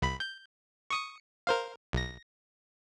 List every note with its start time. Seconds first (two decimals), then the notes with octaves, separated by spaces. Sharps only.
0.02 C2 B5
0.20 G6
0.90 C#6 D#6 C#7
1.47 A#4 C5 F5
1.93 B1 A#6